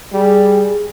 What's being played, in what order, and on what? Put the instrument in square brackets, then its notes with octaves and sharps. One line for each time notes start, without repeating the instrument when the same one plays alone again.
[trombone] G3 [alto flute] G#4